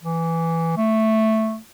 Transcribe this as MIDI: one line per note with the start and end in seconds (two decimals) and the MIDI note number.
0.03 0.75 52
0.77 1.58 57